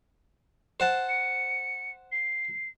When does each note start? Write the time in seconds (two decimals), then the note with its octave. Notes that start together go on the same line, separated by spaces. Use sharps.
0.80 C5 F#5 A5
1.09 C#7
2.12 C7